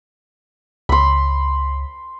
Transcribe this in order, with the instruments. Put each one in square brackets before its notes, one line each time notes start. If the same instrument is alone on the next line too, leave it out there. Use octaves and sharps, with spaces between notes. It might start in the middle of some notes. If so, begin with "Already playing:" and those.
[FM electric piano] C#2 [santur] B5 C6